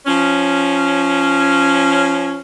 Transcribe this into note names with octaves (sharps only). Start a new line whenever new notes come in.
F3 C#4